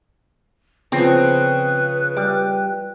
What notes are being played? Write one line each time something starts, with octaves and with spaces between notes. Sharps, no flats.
C#3 F3 B3 C4 B4
G3 D6